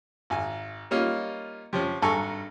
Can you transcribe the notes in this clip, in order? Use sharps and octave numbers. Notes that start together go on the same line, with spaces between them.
G#1 G#5
G3 A#3 C#4 D#4 F4
C3 F3 C#4
G#1 G2 A4 G#5 A#5 C#6